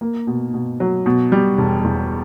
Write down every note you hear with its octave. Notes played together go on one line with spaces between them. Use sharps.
A#3
B2
B2
F#3
B2
G3
E1
E2